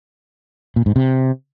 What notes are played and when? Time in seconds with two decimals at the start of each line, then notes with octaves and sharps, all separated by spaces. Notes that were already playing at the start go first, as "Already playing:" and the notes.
0.76 A#2
0.86 G#2
0.96 C3